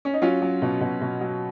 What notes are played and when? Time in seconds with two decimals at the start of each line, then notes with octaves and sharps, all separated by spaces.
0.05 C#4
0.14 D#4
0.22 F#3 C#4 F4
0.42 F#3
0.62 B2
0.81 B2
1.02 B2
1.21 F#3